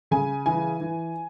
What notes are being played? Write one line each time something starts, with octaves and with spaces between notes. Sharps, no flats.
C#3 G#5
E3 G#5
E3